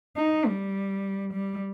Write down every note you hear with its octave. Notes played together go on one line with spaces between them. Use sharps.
D#4
G3
G3